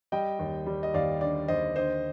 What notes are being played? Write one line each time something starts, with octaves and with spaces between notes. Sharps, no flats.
G3 D#5 G5
D#2
G3
D#5
D#2 D5 F5
D3 D5
D#2 C5 D#5
D3 C5 D#5